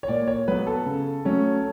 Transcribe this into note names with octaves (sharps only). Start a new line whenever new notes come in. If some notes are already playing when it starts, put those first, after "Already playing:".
C#5
A#2 D5
C#5
F#3 B3 B4
A4
C#3
F#3 A3 C#4